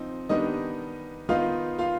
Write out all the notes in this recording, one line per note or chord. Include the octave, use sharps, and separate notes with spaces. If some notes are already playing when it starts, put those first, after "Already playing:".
Already playing: F3 C4 D#4
D#3 G3 B3 D4 D#4 D#5
D#3 B3 D#4 F4 F5
F4 F5